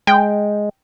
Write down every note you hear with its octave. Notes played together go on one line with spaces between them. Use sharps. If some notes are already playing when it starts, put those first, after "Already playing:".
G#3 G5